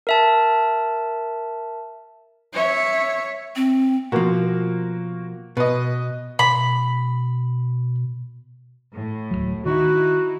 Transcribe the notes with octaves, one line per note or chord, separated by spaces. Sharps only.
A#4 E5 A5
C#5 E5
C4
B2 F3 A#3 F#4
B2 B4 D#5
B2 B5
A2
D1 A#1 F#3
D#3 D#4 E4 F#4